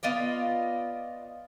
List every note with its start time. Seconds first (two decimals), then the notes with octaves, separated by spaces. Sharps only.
0.03 B3 F4 D5 D#5